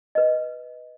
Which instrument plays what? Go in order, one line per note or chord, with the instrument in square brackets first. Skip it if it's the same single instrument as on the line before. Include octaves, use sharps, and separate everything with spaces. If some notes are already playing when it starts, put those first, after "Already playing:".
[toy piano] B4 D#5